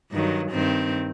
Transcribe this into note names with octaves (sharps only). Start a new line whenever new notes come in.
G2 D#3 F#3
G2 D#3 C4